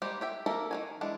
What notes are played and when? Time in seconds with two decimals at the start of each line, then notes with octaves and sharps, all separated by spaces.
0.02 G3 G#3 A#3 G4 C5
0.21 G4 E5 G5
0.46 A#3 A4 A#4 E5
0.71 D#3 F#3 G#5
1.01 E3 G#3 D4